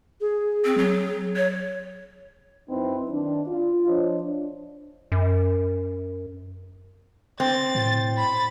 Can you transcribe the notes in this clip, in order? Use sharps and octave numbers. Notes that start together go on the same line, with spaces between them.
G#4
C4
F#3
C#5
F#2 C4 D#4 E4 B4
D#3 D4
F4
F3 D4 C5 C#5 D#5
D4
F#2
C4 A6
A2
B5 A6